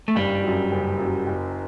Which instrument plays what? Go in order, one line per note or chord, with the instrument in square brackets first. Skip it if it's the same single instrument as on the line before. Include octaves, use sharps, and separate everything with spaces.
[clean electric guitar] A3
[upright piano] F#1 [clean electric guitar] G2 G3
[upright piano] F#2 F#3
F#1
F#2 F#3
F#1